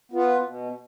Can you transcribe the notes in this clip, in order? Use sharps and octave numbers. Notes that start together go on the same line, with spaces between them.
B3 F4 B4
B2